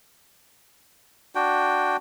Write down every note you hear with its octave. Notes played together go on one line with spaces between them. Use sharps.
D4 F#4 G5